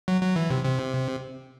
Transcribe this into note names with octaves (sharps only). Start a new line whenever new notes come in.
F#3
F#3
E3
C3
C3